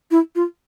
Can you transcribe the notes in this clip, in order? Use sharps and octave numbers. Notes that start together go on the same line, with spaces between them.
E4
F4